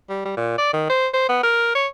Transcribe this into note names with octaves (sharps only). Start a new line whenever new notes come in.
G3
G3
A#2
D5
D#3
C5
C5
B3
A#4
C#5